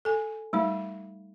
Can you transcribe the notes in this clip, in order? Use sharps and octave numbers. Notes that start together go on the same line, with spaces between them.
A4 G#5
G3 A3 D#4